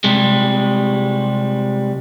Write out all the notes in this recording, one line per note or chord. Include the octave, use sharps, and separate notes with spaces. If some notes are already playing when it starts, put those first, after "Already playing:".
C3 G3 G#3